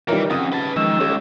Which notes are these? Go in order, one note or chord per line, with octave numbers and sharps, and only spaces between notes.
E3 G3 D#4 F4 A#4 C#5
F2 C#3 F#5 D#6
B4 A5
D#3 F3 G#3 E6
C#2 G4 A4 C#5